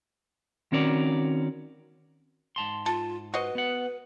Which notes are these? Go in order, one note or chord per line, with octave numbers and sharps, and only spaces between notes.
D#3 C4 C#4 F#4 A#4 D5
G#2 A5 C6
F4 A4
F#4 B4 C5 D#5
B3 F#5